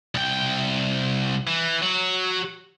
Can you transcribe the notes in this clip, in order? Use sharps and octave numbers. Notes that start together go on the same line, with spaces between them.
C2 G5
E3
F#3 F#4